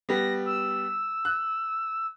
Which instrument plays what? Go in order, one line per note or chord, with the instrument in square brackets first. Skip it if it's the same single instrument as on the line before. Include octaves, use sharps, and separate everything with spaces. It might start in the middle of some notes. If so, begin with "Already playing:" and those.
[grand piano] G3 B3 [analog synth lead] A#6
[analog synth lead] E6
[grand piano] F#6